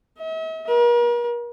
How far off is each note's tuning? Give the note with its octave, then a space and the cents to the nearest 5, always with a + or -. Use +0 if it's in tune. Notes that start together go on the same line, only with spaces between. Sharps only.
E5 -45
A#4 +40